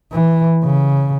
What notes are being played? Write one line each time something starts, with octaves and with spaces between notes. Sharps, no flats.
E3
C#3